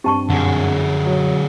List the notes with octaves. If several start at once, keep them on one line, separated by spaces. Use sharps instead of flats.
G2 C4 G4 A5 C#6
F#2 D3 G#4 F#5
F#3